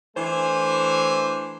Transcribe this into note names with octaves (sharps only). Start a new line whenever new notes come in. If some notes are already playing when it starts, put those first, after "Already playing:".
E3 A3 D4 C5 G#5